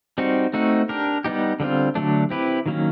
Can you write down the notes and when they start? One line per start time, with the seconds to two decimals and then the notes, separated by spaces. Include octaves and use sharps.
0.18 G3 C4 D#4 F#4
0.53 A3 C4 D#4 F#4
0.89 D4 G4 A#4
1.24 G3 B3 D#4 G4
1.60 D3 G3 C4 F4
1.95 D3 F#3 A3 D4
2.30 C4 E4 G4 B4
2.66 D#3 F#3 A#3 C#4